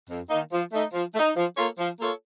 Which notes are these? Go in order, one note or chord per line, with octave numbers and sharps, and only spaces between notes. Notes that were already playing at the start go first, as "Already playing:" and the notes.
F2
D#3 A#3 D#4
F3
A3 D#4
F3
A3
D#4
F3
A#3 F4 A4 C#5
F3
A#3 F4 A4 C#5